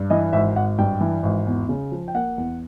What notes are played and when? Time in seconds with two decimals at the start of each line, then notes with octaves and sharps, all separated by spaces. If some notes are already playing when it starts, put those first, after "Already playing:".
Already playing: G2
0.10 E3 D#5
0.33 G#1 E5
0.56 G#1 F#5
0.78 G2 G5
1.01 E3
1.23 G#1
1.46 E2
1.69 C#3
1.92 F3
2.08 G5
2.14 A#3 F#5
2.38 E2